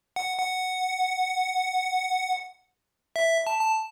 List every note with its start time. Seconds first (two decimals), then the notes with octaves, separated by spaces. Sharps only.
0.16 F#5
0.39 F#5
3.16 E5
3.47 A5
3.61 A5